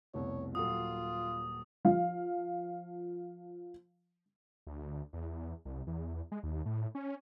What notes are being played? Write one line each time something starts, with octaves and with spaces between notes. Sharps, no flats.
F1 C2 B2 C#5
D#1 F#3 F4 A4 D#6
F3 F5
D2
E2
C2
E2
G#3
D#2
A2
C#4